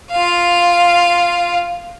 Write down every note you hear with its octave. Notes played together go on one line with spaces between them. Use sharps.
F4 F5